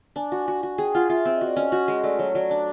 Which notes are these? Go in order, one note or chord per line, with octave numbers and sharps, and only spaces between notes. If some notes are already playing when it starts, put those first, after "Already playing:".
D4 G#5
F#4
F#4
F#4
G#4 G5
F4 F#5
F4 E5
C4 E5
D#5
F#4
D5
C#4 D#5
F#4
G#3
A3 D5
F#3 C#5
F#3 D5
D4 D5